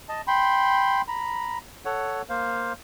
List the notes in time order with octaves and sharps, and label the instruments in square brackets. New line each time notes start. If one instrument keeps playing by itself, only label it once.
[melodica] D#5 A5
G5 B5 C6
A#5 B5
A4 C#5 F#5
A#3 C5 F5